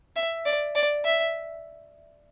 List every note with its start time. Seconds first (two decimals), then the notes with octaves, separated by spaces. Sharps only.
0.16 E5
0.45 D5
0.75 D5
1.04 E5